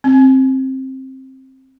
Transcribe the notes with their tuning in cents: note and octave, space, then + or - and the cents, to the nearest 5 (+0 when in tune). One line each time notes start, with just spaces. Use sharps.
C4 +15